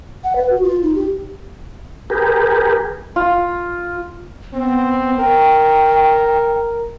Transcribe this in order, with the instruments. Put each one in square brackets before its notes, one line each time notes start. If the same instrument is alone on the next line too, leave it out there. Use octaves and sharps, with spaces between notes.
[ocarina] F#5
B4
F#4
F4
D#4
G4
[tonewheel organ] G4 G#4 A#4 B4
[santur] F4
[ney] B3 [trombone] C4
[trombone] A#4 [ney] G5